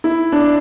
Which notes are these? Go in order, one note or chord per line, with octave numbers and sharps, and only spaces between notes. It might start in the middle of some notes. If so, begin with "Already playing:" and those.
E4
D4